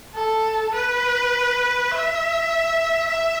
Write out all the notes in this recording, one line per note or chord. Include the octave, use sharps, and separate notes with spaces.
A4
B4
E5
E5